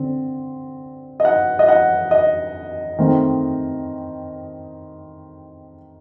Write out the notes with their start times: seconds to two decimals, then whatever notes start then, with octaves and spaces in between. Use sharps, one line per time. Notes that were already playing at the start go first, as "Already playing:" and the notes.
Already playing: D3 C4
1.20 D#5
1.25 F#5
1.59 D#5
1.68 F#5
2.11 D#5
2.99 D#3 A3 C4